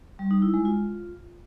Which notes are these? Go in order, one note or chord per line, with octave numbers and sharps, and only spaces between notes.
G3
D#4
E4
G#3
F4